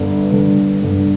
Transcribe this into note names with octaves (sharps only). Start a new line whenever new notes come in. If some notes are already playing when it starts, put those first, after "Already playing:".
Already playing: G1 G2 D3
G1 G2 D3
G1 G2 D3